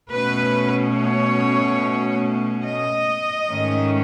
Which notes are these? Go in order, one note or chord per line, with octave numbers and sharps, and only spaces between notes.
B2 A3 C#4 B4
C#5
D#5
G#2 D#3 A3 C#4